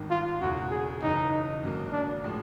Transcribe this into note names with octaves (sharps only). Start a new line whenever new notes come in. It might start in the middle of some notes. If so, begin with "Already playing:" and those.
Already playing: G#1 G2 D#3
F4
E1 E2 C#3 F#4
G#4
F#1 F#2 C#3 E3 D#4
G#1 F#2 D3 F#3 A#3
D4
A2 F3 G#3